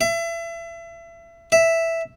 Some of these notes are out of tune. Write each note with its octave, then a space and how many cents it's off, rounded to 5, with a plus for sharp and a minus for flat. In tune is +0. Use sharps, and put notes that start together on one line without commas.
E5 +30
E5 +0